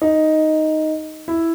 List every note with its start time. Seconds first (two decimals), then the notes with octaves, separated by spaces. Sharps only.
0.02 D#4
1.28 E4